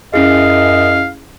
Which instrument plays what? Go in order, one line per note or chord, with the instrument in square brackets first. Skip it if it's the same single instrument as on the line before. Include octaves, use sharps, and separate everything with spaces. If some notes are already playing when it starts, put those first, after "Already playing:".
[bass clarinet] F#2 [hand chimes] C#4 E4 G#4 [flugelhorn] D#5 [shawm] F5